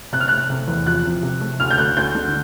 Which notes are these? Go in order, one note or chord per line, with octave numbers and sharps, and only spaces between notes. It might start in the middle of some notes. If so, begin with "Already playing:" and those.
C3 F#6
F6
A3 F#6
C3
E2
F3 F#6
C3
C3
A3
D2 F6
G6
D2 F#6
D2 G6
D3